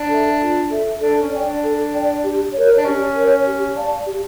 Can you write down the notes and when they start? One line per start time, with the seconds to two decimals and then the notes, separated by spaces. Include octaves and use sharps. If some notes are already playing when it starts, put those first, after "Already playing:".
Already playing: D4
0.10 A4 E5
0.41 F4
0.71 A4 E5
1.02 D4 A4
1.21 C#4
1.32 D5 G5
1.42 D4
1.62 A4
1.93 D5 G5
2.24 G4
2.53 A#4 C#5
2.77 D4
2.84 C#4 G4
3.15 A#4 C#5
3.45 G4
3.76 D5 F5 A5
4.05 G4